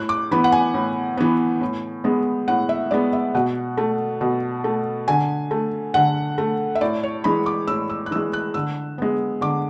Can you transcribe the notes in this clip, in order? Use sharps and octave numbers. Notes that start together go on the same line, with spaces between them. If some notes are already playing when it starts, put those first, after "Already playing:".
Already playing: A2 F#6
D6
E3 B3 B5
F#5
G#5
A2
E3 B3
A2
G#3 B3
A2 F#5
E5
G#3 B3 D5
E5
B2 F#5
A3
B2
A3
D3 G#5
A3
D3 F#5
A3
E5
A2 D5
C#5
E3 G#3 B5
D6
A2 E6
E6
F#6
E3 G#3 E6
F#6
D3 E6
G#3 B3
D3 D6